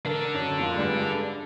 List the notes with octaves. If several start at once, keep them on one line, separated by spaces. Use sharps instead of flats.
D4 A4 A#4
F#2
F2 A#3 F4
G2 G3 G#3